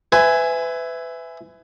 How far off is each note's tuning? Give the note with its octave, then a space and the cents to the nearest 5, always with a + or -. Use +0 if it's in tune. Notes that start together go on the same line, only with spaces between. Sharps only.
B4 +30 E5 +0 G#5 +0